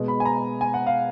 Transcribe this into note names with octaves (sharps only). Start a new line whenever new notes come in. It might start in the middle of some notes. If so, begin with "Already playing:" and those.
Already playing: B2 G#3
B5
G#5
A#5
G#5
F#5
F5